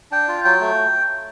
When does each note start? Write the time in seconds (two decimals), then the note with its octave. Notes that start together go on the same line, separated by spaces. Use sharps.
0.11 D4 G5
0.28 F4
0.45 F#3 G5
0.61 A3